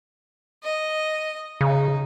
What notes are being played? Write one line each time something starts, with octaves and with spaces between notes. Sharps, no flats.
D#5
C#3 D#4